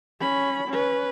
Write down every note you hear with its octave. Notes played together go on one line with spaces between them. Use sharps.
C#4 B5
C#4 B4